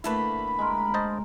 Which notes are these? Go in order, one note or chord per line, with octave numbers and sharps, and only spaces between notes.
D3 A3 A#3 E4 A4 B4 B5
G#3 A#4
C5 D#5 A5